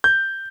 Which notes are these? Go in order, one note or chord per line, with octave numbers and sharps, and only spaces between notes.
G6